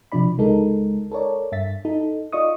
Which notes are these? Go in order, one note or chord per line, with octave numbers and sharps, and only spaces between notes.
C3 F3 D4 D5 B5
C#2 G#3 D#4 A4 A#4
A4 A#4 C#5 D5
G2 E5 A6 B6
D#4 A4
F4 D5 D#5 C#6 D#6